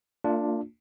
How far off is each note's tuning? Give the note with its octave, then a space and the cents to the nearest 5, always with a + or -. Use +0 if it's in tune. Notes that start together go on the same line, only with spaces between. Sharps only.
A#3 -45 D4 +0 F4 +10